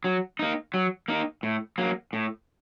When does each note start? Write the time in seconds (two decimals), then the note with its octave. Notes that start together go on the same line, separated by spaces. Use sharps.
0.04 F#3
0.39 A#3 D#4
0.74 F#3
1.08 A#3 D#4
1.43 A2
1.78 F#3 A#3
2.13 A2